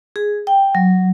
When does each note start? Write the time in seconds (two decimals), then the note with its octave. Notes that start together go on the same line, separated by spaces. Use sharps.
0.16 G#4
0.47 G5
0.75 F#3